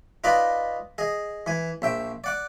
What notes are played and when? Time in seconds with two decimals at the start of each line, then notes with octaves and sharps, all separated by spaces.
0.24 D#4 F4 B4 D5 D#5 B5
0.98 G#4 D#5
1.46 E3 G#5
1.82 A#1 E5 G5
2.24 D5 F#5 D6